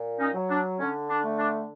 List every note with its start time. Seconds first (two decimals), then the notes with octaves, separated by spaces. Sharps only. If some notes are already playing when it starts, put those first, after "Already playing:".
Already playing: A#2
0.19 C#4 D#4
0.35 F#3
0.50 D4
0.80 D3 C#4
1.09 D4
1.25 A3
1.39 D4